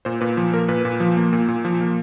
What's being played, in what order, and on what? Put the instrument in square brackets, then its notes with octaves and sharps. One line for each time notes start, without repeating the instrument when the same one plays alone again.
[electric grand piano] A#2 C5
A#2 B4
F3
A#3 A#4
A#2 B4
A#2
F3
A#3
A#2
A#2
F3
A#3